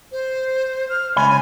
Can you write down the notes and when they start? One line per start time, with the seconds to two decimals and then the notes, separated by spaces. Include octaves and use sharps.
0.12 C5
0.89 F6
1.16 C#2 C#5 G#5 B5